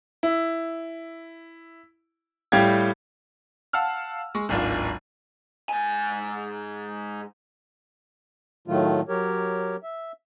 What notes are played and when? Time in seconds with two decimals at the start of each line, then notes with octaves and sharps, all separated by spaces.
0.23 E4
2.52 A2 G3 G4 F5 G5 G#6
3.73 F5 F#5 A5 E6 F6
4.35 G#3 C#6
4.49 D1 G#1 D4 F4
5.69 G#2 G#5
8.68 A2 D#3 F#3 A3 F4
9.09 F#3 G4 A#4 C#5
9.83 E5